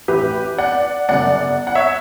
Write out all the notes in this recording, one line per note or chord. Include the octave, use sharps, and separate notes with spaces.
A1 A2 E3 G4 B4
D5 F#5
G1 F#2 C#3 D5 F#5
F#5
C#5 E5